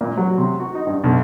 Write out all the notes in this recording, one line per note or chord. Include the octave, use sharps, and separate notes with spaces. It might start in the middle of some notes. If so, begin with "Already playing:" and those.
A#2
F#3
C3
F#4
D#4
G2
B1